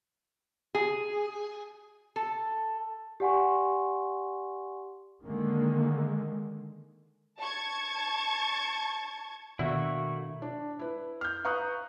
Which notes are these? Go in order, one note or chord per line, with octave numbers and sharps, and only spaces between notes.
G#4
A4
G4 D5 F#5 G#5 C6 C#6
D3 D#3 G#3 A#3
A5 C#6 G#6
B2 D#3 A3 A#3 D4 E4 F#4 E5
D4
E4 B4
F6 G6
B4 F5 A#5 C#6 D#6 F#6